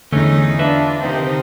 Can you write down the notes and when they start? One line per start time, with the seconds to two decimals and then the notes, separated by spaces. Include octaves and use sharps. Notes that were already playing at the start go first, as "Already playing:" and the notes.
0.13 E2 D3 A3 C#4 D#4
0.59 D4 F4 B4 E5
1.02 C3 D#3 C4 D#4